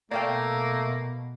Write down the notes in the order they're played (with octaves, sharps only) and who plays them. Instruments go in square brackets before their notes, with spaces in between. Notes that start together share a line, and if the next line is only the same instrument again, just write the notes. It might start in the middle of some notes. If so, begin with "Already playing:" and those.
[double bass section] B2 [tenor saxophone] A3 [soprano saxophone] A#3 [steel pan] D5 F5 G5